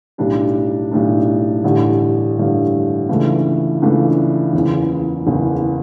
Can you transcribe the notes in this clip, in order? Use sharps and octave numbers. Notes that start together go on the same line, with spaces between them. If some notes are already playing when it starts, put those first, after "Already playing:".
B1 A2 G3 D4
B1 A2 G3 D4
A1 G2 D3 G3
A1 G2 D3 G3
C#2 C#3 E3 A3 D4
C#2 C#3 E3 A3 D4
F#1 E2 C#3
F#1 E2 C#3